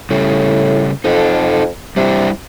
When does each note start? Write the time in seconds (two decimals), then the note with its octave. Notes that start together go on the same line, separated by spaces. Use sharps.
0.10 A2 C#3 G3
1.04 F2 D#4 A4
1.96 C3 G3 D4 E4